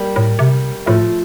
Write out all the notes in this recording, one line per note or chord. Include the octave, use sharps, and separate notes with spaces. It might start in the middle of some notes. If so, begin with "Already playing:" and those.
Already playing: G3 A#3
A2
C3
A2 F3 A3